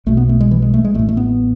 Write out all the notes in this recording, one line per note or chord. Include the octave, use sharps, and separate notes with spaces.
B1 B2 A3
B3
A3
G#3
E3
G#3
A3
G#3
A1 A2 A3
A3
B3